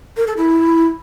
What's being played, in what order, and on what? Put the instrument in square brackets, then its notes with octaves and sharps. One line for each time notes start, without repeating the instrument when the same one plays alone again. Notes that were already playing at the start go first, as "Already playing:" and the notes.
[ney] A#4
A4
E4